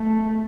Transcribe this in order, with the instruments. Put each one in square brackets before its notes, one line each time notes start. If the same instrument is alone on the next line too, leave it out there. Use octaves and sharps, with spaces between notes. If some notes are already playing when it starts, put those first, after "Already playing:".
Already playing: [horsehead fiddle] A3